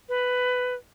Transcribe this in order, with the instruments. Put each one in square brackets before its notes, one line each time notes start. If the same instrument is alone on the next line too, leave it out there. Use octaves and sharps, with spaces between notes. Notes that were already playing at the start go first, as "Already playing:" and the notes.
[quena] B4